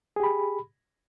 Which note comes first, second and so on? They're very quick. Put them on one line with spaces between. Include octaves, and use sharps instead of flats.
G#4 G4 B5